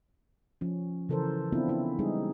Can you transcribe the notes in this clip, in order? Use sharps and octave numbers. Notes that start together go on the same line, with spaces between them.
F3 C#4
C#3 E3 A4 A#4 C5
B3 C4 D4 E4 F4
C#4 E4
G3 G#3 D#4 G#4